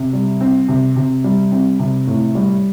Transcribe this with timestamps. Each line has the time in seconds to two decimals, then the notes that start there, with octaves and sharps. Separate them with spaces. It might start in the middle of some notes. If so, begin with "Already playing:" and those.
Already playing: C3
0.13 G3
0.41 C4
0.68 C3
0.96 C3
1.24 G3
1.52 C4
1.79 C3
2.07 A2
2.35 G3